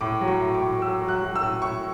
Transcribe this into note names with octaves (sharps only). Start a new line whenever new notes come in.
A2 D6
F#3
C#6
A2
D6
A2
F#3 E6
F#3
F#6
F#3
E6
A2
A2 C#6